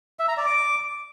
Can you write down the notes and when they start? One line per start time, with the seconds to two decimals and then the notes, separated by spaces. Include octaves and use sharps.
0.19 E5
0.28 A#5
0.37 D5
0.46 D6